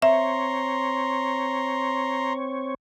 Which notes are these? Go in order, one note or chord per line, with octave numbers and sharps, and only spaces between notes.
C4 C#5 E5 A#5 C6